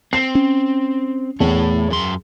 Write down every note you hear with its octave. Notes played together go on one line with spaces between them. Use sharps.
C4 C7
C#4
E2 A3 C#5
F#2 C6